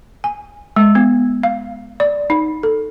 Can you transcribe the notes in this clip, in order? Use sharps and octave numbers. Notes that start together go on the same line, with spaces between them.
G#5
G#3
B3
F5
D5
D#4
A4